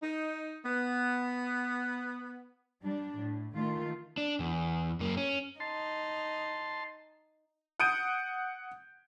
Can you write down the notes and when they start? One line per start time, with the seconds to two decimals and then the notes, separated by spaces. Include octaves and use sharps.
0.02 D#4
0.64 B3
2.82 G3 D4
3.19 A2
3.56 D#3 A3 F4
4.17 D4
4.40 E2
5.00 F#2 A#3
5.17 C#4
5.60 D#4 A5 C6
7.80 F#5 D#6 G6 D7 D#7